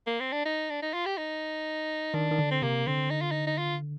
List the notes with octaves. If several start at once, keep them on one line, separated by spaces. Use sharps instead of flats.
A#3
C4
D4
D#4
D4
D#4
F4
G4
D#4
D#3 D4
D#3
D3
C4
C3 A#3
D3 C4
D#4
F4
D#4
D#4
F4